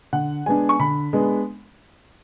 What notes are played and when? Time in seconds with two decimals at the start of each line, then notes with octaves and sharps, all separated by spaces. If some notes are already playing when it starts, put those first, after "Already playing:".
0.13 D3 F#5
0.46 G#3 B3 D4 G#5
0.69 C#6
0.79 D3 B5
1.13 G#3 B3 D4